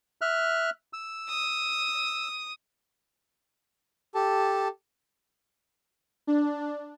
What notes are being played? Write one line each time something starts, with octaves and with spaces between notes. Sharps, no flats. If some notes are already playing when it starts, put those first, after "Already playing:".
E5 F6 F#6
E6
D#6
G4 A4 A5
D4